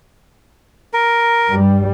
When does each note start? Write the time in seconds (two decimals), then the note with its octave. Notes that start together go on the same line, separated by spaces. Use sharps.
0.93 A#4
1.49 G2 G3